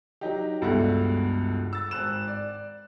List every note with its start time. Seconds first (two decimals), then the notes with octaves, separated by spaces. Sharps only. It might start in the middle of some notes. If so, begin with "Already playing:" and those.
0.21 F#3 D#4 G4
0.62 C#2 G2 B2 A4 E5 F#5
1.73 E6 A6
1.91 G#1 F#6 E7
2.28 D5